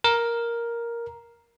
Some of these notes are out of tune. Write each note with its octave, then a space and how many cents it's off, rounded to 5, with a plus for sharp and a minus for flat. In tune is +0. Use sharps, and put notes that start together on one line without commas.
A#4 +5